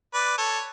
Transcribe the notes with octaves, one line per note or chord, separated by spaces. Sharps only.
B4 D5
A4 C#5